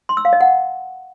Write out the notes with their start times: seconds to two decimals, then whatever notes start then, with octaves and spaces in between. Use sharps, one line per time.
0.09 C6
0.17 E6
0.25 F5
0.33 D#5
0.41 F#5